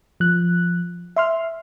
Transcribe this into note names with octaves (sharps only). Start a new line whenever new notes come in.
F3 F#6
E5 C6 F6